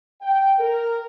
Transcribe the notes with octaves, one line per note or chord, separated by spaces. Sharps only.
G5
A#4